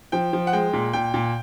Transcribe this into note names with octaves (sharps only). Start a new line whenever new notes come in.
F3 G5
F3
F#5
G#3 G5
A#2
A#2 G5
A#2